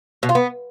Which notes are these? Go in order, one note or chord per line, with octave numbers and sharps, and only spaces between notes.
B2
F4
B3